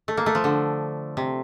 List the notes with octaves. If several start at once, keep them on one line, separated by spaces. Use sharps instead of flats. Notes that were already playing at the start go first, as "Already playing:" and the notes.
A3
A#3
A3
F3
D3
C3